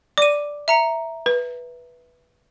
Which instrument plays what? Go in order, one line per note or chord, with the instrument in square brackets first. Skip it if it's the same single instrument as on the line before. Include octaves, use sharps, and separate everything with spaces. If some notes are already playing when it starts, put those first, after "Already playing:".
[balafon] D5 [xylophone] D6 D#7
[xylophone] E5 A#5 C#7
[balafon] B4